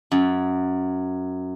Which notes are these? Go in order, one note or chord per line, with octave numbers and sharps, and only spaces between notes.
F#2